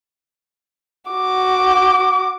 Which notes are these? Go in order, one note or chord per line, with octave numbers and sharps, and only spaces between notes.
F#4 D6